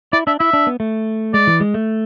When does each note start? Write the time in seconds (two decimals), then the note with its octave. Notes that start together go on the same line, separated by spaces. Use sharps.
0.13 E4 D5
0.27 D4 E5
0.39 E4 E5
0.53 D4
0.67 B3
0.80 A3
1.34 G#3 D5
1.47 E3
1.60 G#3
1.74 A3